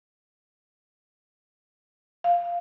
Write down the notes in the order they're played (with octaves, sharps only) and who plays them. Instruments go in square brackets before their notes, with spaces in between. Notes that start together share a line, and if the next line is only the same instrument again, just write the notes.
[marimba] F5